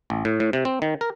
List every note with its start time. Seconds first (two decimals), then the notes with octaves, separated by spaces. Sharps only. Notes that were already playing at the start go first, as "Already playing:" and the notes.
0.10 A1
0.25 A2
0.40 A2
0.53 C3
0.65 C4
0.82 D#3
1.01 A#4